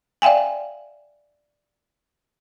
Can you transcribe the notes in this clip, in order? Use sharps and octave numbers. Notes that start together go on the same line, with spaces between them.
D5 E5 F5 G5 G#5